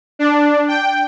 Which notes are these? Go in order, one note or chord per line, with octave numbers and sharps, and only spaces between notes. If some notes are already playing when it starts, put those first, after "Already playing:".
D4
G5